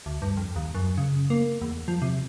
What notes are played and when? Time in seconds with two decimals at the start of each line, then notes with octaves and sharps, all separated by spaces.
0.06 D2
0.22 G2
0.37 F2
0.56 D#2
0.75 F#2
0.98 C#3
1.30 A#3
1.62 E2
1.88 F3
2.02 C3